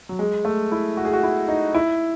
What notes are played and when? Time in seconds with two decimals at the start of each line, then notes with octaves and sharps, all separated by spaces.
0.09 F#3
0.19 G#3
0.45 A3
0.72 E4
0.97 F#4
1.05 G#4
1.13 F#4
1.23 E4
1.48 D#4
1.74 E4